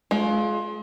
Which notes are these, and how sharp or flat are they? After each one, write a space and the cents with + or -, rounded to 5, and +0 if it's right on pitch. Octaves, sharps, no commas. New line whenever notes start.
G#3 +35 F4 +0